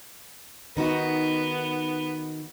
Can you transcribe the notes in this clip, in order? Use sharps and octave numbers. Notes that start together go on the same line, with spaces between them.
D#3 B3 D#4 F#4